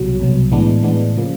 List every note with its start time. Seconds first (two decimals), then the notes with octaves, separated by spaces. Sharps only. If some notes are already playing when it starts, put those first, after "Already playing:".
Already playing: C2 B2 F#3
0.20 C2 B2 F#3
0.51 A2 E3 G#3 B3 D4
0.83 A2 E3 G#3 B3 D4
1.16 C#3 F3 A#3